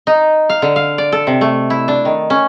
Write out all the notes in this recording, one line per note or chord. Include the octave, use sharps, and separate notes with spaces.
D#4
F5
D3
F5
D5
A4
C3
A3
E4
D4
D#3
C#4